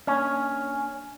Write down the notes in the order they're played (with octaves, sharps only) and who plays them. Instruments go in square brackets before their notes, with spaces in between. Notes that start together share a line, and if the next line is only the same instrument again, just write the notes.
[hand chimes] A#3 D4 F6 [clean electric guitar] C#4